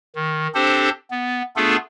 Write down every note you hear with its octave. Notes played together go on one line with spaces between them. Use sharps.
D#3
C4 D4 G4 A4 C5
B3
A3 B3 D4 F4 G#4 A4